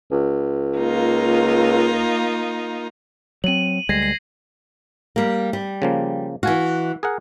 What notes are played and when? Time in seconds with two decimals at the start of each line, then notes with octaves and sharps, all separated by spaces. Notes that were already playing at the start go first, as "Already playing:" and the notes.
0.11 C#2
0.76 A#3 D#4 F4
3.44 F#3 C4 D#7 F#7
3.89 D2 G3 G#3 G#6 A#6 C7
4.02 C7
5.16 G3 A#3
5.53 G3
5.82 C#3 F3 A#3
6.43 E3 F#4 F5 G#5
7.03 G#4 A#4 F#5